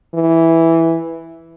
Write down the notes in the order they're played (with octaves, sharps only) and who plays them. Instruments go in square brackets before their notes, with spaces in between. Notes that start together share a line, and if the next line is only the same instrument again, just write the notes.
[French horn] E3